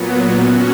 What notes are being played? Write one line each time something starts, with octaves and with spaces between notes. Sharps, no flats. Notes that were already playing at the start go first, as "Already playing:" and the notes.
Already playing: A#2 F#3 B3
C#4 F#4